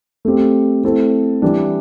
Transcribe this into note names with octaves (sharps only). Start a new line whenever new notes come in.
A3 C4 G4
A3 C4 E4 A4 C5
E3 G3 D4